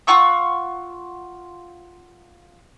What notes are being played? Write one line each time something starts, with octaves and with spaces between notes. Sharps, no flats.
F4 F#5 C#6 E6